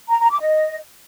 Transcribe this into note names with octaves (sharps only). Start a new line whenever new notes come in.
A#5
A#5
D6
D#5